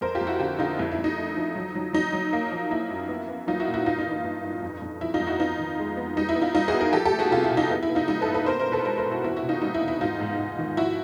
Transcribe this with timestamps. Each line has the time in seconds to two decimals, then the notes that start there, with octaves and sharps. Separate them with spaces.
0.01 F2 A#4 C5
0.15 F4 G4
0.21 F2
0.27 E4 F#4
0.40 D3 F4 G4
0.59 D3 D#4 F4
0.79 F2 E4
0.92 E4
0.98 F2
1.04 D#4
1.17 A3
1.37 F3
1.56 F#3
1.75 F#3
1.93 F#3 D#4
2.13 F#3
2.33 A#3
2.52 F3
2.71 A#3 E4
2.91 F#2
3.09 B3
3.29 B3
3.47 F#3 D#4 F4
3.60 E4 F#4
3.67 A#2
3.74 E4 F#4
3.86 G2 D#4 F4
3.99 D#4
4.06 E3
4.12 D#4
4.24 G2
4.44 G2
4.62 F2
4.82 F2
5.01 F3 E4
5.14 D#4 F4
5.20 F2
5.27 E4 F#4
5.39 B3 D#4 F4
5.59 D#3
5.79 G#3
5.97 B3
6.16 G3 D#4
6.29 E4
6.35 B3
6.41 D#4 F4
6.54 G3 D#4 F4
6.68 F#4 G#4
6.74 B3
6.81 G#4 A#4
6.93 F3 G4 A4
7.05 G4 A4
7.12 A3
7.19 F#4 G#4
7.31 C3 F4 G4
7.44 E4 F#4
7.51 C3
7.57 D#4 F4
7.70 B3 E4
7.83 E4
7.90 B3
7.95 D#4 F4
8.08 G3 D#4 F4
8.21 A4 B4
8.27 G2
8.34 A4 B4
8.46 B3 A#4 C5
8.60 A#4 C5
8.67 B2
8.72 A4 B4
8.85 G#3 A#4 C5
8.98 A#4 C5
9.05 B2
9.10 E4 F#4
9.24 E2 E4 F#4
9.36 E4 F#4
9.43 C3
9.49 D#4 F4
9.62 G3 D#4
9.74 E4
9.81 E2
9.88 E4
10.01 G#2 D#4 F4
10.20 G#2
10.39 G#2
10.59 D#3
10.77 F3 E4 F#4